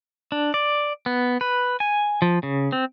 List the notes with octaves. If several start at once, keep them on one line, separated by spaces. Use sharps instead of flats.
D4
D5
B3
B4
G#5
F3
C#3
C4